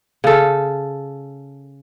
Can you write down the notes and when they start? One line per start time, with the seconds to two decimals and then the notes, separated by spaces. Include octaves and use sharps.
0.24 C#3 A4